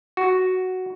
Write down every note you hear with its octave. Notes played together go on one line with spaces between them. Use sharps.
F#4